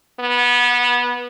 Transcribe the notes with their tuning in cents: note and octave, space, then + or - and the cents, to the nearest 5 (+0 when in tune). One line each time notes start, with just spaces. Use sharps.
B3 -20